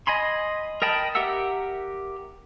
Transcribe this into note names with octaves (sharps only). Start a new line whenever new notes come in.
D#5 G#5 B5 C6
A#4 D#5 G5 A5 B5
G4 A#4 E5 F#5 E6